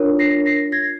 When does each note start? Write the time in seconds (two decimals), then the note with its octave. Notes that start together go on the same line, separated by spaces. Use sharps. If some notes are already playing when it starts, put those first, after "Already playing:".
Already playing: D4 F4 A#4 C#5
0.19 A#6 C7
0.46 A#6 C7
0.72 G#6 A#6